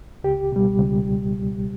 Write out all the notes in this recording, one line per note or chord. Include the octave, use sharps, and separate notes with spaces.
C#2 G4
B2 G3
C#2